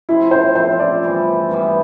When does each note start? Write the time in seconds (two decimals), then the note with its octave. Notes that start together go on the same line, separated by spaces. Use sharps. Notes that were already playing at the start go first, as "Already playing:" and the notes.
0.09 F3 A3 C4 E4 F4
0.31 C5
0.55 F3 A3 C4 F4 C5
0.80 D5
1.03 G2 E3 G3 B3
1.49 G2 E3 G3 B3